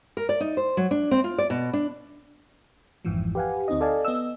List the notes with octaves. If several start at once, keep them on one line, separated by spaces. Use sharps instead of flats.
A#4
D5
D#4
C5
F#3
D4
C4
F4
D5
B2
D4
G#1 F2 G#2 E3 F3
G4 B4 F5 F#5 G#5
D2 C4 D#4 D#5
A4 D5 D#5 F5 G#5 A5
B3 D#5 E6